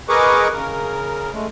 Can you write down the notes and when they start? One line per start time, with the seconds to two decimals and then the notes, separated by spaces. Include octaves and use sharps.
0.09 G#4 A#4 B4 D#5 C#6 D6
0.53 C#3 A#4
1.34 G#3 A3